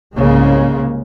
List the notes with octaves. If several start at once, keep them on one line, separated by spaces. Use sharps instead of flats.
C2 G#2 C#3 G#3 A#3